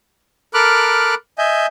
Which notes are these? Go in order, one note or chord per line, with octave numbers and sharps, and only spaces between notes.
A4 A#4 B5 D6 F6 F#6
D#5 E5 G#5 G6